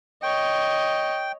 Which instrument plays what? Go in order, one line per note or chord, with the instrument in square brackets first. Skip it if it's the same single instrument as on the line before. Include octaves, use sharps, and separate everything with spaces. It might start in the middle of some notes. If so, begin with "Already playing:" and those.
[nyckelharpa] C#5 D#5 [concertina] G5